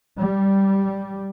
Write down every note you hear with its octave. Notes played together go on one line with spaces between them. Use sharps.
G3